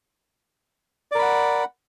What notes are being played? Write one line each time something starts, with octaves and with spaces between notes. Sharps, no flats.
A#4 D5 F#5 B5